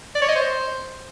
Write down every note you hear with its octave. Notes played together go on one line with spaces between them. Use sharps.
D5
C#5
D#5
C5